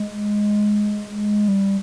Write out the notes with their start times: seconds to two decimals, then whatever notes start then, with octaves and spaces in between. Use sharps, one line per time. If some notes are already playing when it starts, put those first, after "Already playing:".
Already playing: G#3
1.48 G3